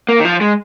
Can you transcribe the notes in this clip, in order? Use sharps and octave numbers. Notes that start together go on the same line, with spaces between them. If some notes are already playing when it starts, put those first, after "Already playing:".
A#3
D#3
F3
G#3